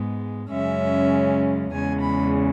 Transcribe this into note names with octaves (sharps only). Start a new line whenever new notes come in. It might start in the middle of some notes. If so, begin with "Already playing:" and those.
Already playing: G#2 G#3 B3
F#2 C#3 G#3 C#4 E5
E2 C#3 G#3 G#5
B5